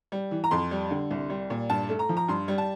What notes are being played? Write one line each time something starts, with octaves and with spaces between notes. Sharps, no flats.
G3
E3
A#5
F2 C6
G3
D3
C2
G3
A#2
G2 A5
A3
A#5
F3
A#5
G2 C6
G3
A5